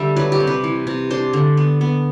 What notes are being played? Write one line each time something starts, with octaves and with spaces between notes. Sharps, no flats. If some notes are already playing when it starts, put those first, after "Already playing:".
Already playing: D3 G3 E5
F#3 B4
G4
C3
B4
E3
C3
D4 C5
D3
B3
B3